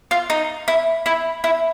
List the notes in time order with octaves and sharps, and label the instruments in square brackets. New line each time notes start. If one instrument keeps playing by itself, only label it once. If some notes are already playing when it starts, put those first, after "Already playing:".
[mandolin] F4
D#4
E4
E4
E4